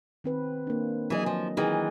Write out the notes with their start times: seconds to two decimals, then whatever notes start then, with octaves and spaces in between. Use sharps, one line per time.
0.24 D#3 C4 B4
0.67 A#3 D4
1.10 E3 F#3 G#4 D#5
1.26 F3
1.57 D#3 E3 D#4 G#4